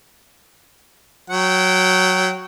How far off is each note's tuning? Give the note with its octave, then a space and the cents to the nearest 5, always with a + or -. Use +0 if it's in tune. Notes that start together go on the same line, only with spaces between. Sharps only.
F#3 +0 G5 -25